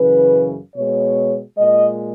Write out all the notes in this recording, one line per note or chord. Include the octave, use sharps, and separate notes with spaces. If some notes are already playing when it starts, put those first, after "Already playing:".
Already playing: F#2 C#3 E3 B4
B2 G#3 C#5
A#2 G#3 D#5